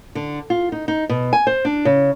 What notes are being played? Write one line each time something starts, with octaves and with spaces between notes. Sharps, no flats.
D3
F4
D#4
D#4
B2
G#5
C5
D4
C#3